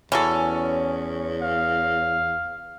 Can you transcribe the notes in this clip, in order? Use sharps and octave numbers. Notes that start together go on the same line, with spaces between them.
E2 E3 F#3 C#4 A4
F5